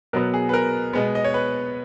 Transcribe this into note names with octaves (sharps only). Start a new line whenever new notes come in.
B2 F#3 B3 A#4
G#4
B4
A#4
B2 G#3 B3
D#5
C#5
B4